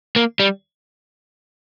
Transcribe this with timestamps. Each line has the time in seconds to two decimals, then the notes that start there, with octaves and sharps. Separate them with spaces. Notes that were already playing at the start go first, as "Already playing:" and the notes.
0.16 A#3
0.40 G3